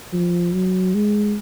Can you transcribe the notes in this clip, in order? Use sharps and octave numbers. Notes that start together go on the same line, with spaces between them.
F3
F#3
G#3